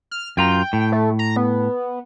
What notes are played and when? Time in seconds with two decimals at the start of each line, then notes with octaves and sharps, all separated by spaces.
0.11 F6
0.37 F#2 F4 G5 A#5
0.73 A2
0.92 A3
1.19 A#5
1.36 B3